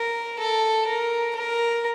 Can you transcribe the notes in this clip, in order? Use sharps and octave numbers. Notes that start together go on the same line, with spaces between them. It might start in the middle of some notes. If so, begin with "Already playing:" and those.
Already playing: A#4
A4
A#4
A#4